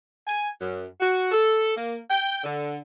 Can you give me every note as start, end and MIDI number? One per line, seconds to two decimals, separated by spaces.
0.27 0.49 80
0.61 0.85 42
1.00 1.29 66
1.32 1.76 69
1.76 1.97 58
2.09 2.41 79
2.43 2.77 50